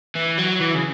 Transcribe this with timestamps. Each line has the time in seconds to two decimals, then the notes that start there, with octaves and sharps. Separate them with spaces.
0.16 E3
0.38 F#3
0.61 E3
0.75 C#3